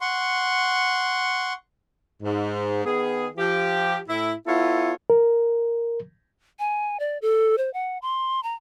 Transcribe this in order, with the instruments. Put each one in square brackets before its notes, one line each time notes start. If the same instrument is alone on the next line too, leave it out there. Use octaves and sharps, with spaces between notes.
[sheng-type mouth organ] F#5 C6 C#6
[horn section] G#2
D#3 B3 G#4
F3 G4
A2 E4
B3 E4 F4 A4 C#5
[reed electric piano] A#4
[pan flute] G#5
D5
A4
C5
F#5
C6
A#5